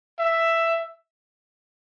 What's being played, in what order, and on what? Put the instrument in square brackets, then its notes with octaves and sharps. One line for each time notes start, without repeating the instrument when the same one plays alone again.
[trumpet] E5